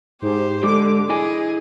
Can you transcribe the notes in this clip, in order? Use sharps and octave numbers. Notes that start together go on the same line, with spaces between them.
G#2 G4 C5
D3 G#3 G4 D6
E4 G#4 D#5 G#5